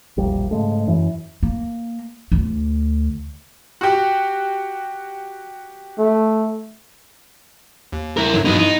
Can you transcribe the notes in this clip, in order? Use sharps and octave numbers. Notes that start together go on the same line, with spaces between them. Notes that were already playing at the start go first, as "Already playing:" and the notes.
E1 A#1 G3
G#2 C#3 G#3 A3
F#2 E3
A#3
D2
F#4 G4
A3
D#2
E4 A#4
G2 D3 F#3
G2 F#3 B3 D#4 E4
D#4